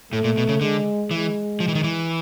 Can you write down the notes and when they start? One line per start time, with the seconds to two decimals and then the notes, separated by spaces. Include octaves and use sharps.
0.13 A2 A3
0.24 A#2
0.37 B2
0.49 C#3
0.61 D3 G#3
1.11 E3 G#3
1.60 F3
1.68 E3
1.75 D#3
1.84 E3